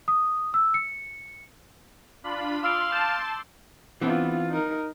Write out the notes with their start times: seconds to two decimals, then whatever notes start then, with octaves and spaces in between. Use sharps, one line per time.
0.08 D#6
0.54 E6
0.74 C#7
2.24 D4 F4 B5
2.63 F5 C6 D6 E6 D7
2.92 A5 G6
4.01 E3 B3 C4 D4 F4
4.50 D#4 A#4